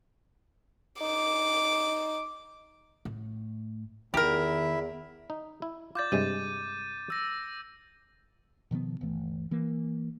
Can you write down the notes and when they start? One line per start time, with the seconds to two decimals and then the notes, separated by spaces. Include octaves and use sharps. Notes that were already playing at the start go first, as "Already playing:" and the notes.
1.01 D#4 D6
3.05 A2
4.14 E2 D#3 E4 G4 A#4 E5
5.30 D#4
5.62 E4
5.95 F4 D5 D6 G6 A6
6.12 G2 C3 G#3 D#7
7.10 E6 A#6
8.71 B2 D#3 F3 B3
9.01 G1 D2 E3 A3
9.51 E3 A#3